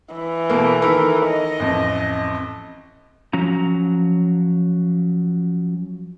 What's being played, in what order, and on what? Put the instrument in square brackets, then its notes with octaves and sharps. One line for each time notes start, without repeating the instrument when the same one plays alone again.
[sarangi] E3
[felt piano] B2 A3 A#3
D#3 A4 A#4
[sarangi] D#5
[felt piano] A1 F2
[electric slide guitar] F3 F#3 C#4 A#5